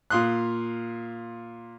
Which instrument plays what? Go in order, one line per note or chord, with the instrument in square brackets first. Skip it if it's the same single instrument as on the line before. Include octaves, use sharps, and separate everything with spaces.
[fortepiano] A#2 F5 C6 D#6 F#6